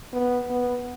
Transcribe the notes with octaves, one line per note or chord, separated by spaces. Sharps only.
B3
B3